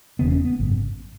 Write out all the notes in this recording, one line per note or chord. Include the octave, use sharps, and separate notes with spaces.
E1 E2 C#3 B3
C#4
B3
G#1 F#2 C#3